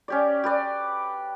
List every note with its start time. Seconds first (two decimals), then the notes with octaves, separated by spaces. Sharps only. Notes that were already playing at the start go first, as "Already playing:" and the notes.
0.08 C#4 G4 D5
0.44 G4 B4 D5